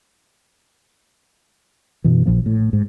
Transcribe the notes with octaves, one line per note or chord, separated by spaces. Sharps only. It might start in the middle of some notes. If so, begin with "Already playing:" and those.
F#2 B2 E3
A#1 A#2 F3 A#3
A2
G#2